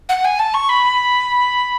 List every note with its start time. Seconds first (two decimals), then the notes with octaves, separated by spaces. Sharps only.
0.09 F#5
0.24 G#5
0.39 A5
0.54 C#6
0.69 B5